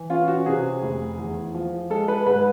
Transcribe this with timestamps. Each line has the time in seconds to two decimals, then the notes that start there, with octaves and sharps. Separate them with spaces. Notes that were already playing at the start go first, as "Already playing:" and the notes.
Already playing: E3
0.10 C#4 F4
0.28 F#4
0.46 C3 G#4
0.82 F1
1.18 E2
1.54 F3
1.90 G#3 A4
2.08 B4
2.26 G#2 B4